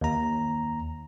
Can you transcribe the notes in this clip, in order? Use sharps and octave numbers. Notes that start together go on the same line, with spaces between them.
D#2 A#5